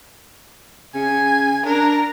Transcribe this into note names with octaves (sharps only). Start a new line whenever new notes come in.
C#3 G#5
D4 A#4